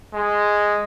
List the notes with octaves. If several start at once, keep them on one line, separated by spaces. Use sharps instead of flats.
G#3